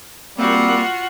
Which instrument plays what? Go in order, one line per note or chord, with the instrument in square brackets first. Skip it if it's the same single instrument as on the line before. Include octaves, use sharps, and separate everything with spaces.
[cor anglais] G3 [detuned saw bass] A#3 [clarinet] C4 [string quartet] F4 F#4 F#5